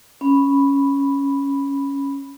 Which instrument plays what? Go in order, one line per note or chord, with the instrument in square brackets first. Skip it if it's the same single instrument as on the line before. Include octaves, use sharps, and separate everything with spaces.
[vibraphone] C#4 B5